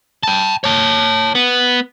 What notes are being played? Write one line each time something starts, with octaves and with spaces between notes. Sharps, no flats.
G5 A5
C#5 A5
B3